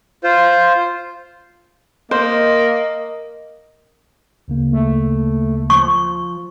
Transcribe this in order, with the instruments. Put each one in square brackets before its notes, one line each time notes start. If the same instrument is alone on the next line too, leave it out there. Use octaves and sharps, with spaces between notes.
[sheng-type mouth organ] F4 C5
[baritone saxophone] A#3 [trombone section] A#4 [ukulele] C5 [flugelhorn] D#5
[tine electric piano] D2 C#3 A#3
[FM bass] A3
[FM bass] F3 [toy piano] C#6